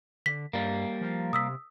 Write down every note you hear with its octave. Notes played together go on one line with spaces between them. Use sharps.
D3 B6
G2 G3 A#3
F3
C3 D#6 E6 B6